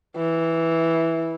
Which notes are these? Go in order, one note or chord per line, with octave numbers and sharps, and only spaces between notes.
E3